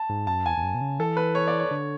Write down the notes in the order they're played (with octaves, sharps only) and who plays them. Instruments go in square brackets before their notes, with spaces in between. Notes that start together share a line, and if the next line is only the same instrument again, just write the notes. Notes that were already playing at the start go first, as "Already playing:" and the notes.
Already playing: [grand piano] A5
[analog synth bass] G#2
[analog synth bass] F#2 [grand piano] A5
[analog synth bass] E2 [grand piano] G#5
[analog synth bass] E2
F#2
B2
C#3
[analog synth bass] E3 [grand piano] A4
[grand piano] B4
C#5
D5
C#5
[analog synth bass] D3